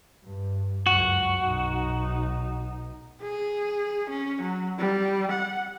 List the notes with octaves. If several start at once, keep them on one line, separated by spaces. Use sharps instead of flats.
G2
C#2 F#2 F#4
B1 D#4
G#4
C#4
F#3
G3
F#5